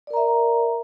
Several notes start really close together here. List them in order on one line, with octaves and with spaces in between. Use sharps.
D5 A#4 A#5 E5